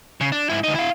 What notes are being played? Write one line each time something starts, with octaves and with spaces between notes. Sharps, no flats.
C#3
D4
G#2 E4
D2 D#4
E4 F5